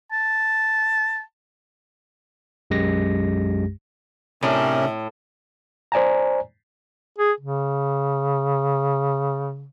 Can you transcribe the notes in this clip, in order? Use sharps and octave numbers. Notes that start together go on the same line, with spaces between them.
A5
B1 F#2 G#3 G4 A#6
A2 C3 C#4 D4 G4 A#4 E5
C5 D5 G#5 A#5
G#4
C#3